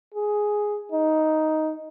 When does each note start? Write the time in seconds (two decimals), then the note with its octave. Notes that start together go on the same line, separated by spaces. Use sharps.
0.14 G#4
0.92 D#4